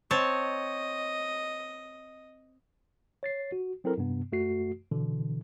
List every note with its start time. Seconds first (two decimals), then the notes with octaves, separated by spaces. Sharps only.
0.11 C4 C#5 D#5 A5
3.23 C#5 A6 C7
3.52 F#4
3.84 F#3 C4 E4 A4 A#4
3.98 G2 C3 B3
4.32 F#2 A3 F#4 C7
4.91 B2 D3 E3